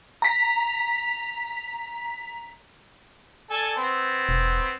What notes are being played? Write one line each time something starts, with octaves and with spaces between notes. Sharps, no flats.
A#5 B6
A4 D5 G#5
B3 C4
E1